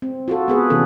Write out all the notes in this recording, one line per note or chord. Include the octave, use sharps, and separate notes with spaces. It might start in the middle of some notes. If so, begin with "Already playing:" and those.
C4
F4 F#4 A4
B3 G#4 B4
C3 E3 C#4 A4